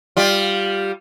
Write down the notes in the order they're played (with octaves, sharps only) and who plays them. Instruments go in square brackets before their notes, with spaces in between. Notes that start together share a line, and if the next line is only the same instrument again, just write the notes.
[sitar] G3 F4